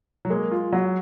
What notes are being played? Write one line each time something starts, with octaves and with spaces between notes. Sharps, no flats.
F#3
G#3 A#3
F4
F#3